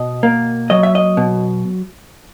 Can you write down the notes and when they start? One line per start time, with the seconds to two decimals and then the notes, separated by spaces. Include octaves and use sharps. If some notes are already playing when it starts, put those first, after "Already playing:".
Already playing: B2 D#5
0.23 A#3
0.70 F#3 D#5
0.83 E5
0.95 D#5
1.17 B2